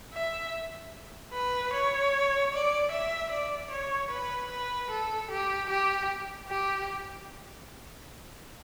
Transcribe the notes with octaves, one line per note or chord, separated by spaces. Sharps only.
E5
B4
C#5
D5
E5
D5
C#5
B4
B4
A4
G4
G4
G4